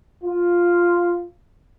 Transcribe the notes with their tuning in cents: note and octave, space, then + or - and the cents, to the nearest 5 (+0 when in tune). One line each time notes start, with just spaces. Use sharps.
F4 +0